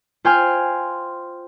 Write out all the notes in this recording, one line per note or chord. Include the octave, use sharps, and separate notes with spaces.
F4 C5 G5 G#5 C6 F6